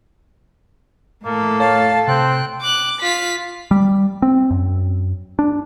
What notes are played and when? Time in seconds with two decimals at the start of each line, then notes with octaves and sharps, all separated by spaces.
1.25 A2 A#3 A4
1.60 C#5 F5 A5
2.08 C3 C4 G5 F#6
2.61 D6 F#6
3.01 F4 B6
3.71 G3
4.22 C4
4.51 F#2
5.39 D4